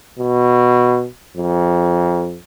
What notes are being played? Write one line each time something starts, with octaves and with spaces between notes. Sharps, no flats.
B2
F2